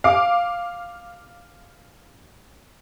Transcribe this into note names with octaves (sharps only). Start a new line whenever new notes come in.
F5 D6